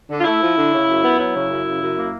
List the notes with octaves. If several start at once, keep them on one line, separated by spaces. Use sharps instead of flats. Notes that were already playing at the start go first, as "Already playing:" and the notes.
D3
F4
A3 E4
F3
D3
C#3
F#2
B3
F#3 E4
C#3
F#2
C#3
F#2
A#3